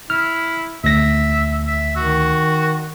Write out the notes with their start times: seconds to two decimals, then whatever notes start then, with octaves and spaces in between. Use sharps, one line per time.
0.10 E4 F6
0.84 D2 E5 A#6
1.67 E5
1.96 D#3 F#4